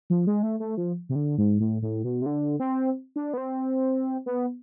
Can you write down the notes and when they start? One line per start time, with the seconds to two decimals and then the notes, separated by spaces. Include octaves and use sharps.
0.10 F3
0.27 G#3
0.43 A3
0.60 A3
0.77 F3
1.09 C3
1.16 D3
1.38 G#2
1.60 A2
1.82 A2
2.04 B2
2.22 C3
2.26 D3
2.60 C4
3.16 D4
3.34 B3
3.38 C4
4.26 B3